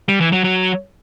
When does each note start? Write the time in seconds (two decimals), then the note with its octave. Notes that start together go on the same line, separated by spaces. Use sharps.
0.09 G3
0.21 E3
0.32 F#3
0.44 F#3